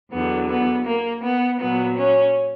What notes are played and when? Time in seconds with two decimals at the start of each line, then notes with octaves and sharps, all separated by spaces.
0.12 E2 D3 F#3 B3
0.50 B3
0.86 A#3
1.22 B3
1.59 A#2 F#3 B3
1.97 C#4